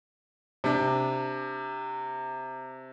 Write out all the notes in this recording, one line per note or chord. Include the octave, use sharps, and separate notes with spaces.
C3 D4